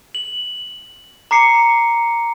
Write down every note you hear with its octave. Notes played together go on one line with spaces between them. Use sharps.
F#7
A#5 D6 C7 C#7